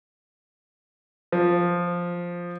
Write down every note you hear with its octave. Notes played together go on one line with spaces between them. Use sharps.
F3